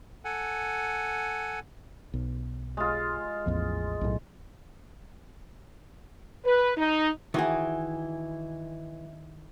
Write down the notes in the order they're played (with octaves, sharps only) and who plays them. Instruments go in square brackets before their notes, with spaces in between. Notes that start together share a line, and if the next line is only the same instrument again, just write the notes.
[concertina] A4 F#5 G#5
[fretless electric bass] B1
[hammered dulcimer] G#3 F4
[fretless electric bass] A1 E2 F3
B1 A2
[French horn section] B4
D#4
[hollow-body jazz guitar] D#3 F#4 G#4 [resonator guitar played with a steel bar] E3